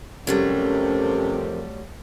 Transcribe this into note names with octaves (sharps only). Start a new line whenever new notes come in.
F2 C3 F#3 G3 A3 C#4 A#4